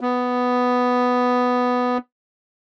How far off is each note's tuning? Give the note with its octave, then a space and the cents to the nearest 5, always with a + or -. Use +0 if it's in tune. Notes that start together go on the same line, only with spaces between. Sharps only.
B3 +5